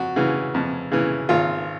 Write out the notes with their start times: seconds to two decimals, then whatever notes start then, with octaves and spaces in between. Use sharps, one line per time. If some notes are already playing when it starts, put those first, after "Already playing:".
Already playing: F2 F#4
0.16 C#3 E3
0.54 F2
0.92 C#3 E3
1.29 G#1 F4